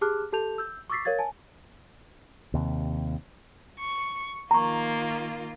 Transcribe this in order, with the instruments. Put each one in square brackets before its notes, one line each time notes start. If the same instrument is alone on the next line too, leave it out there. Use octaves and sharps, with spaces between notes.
[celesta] G4 G#4 A5 D6 F6 F#6
G4 A4 A5 G6 F7
E6 G6
C#6 D6 E6 A6 B6 C7
A#4 C#5 F5 G#6 A6
G#5 A5
[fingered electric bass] D#2 C3
[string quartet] C#6
[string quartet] D#3 A#3 F4 [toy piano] A#5 C#6